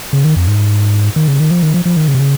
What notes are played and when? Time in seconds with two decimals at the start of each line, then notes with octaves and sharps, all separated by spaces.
0.13 C#3
0.24 D#3
0.36 F2
0.48 G#2
1.16 D#3
1.28 C#3
1.40 D#3
1.51 F3
1.63 D#3
1.74 F3
1.85 F3
1.97 D#3
2.08 C#3
2.14 C3
2.20 C#3